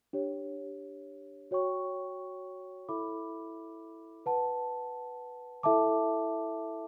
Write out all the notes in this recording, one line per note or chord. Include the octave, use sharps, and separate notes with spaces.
D4 G4 C#5
F#4 C#5 G5 C#6
E4 A4 E5 B5 D6
B4 F#5 A5
E4 A4 E5 A5 D6